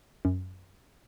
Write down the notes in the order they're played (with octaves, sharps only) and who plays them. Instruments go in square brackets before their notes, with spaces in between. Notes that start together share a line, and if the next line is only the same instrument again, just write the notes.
[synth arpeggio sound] F#2